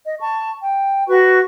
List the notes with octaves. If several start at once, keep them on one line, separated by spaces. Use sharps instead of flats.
D#5
A5 C#6
G5
F#4 B4 C#6